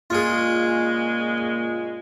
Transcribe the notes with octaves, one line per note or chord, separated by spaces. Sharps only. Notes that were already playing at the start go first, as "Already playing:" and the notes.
A#2 C#3 G#3 F4 G#4